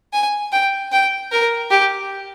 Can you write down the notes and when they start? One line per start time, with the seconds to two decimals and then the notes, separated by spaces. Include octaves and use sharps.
0.13 G#5
0.52 G5
0.92 G5
1.31 A#4
1.71 G4